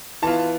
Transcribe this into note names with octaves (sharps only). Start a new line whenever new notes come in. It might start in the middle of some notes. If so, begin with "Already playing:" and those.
E3 B3 F4 A5